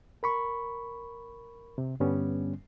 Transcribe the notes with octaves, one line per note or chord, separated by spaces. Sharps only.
A#4 B5 C#6
C3
G2 D3 G3 B3 C#4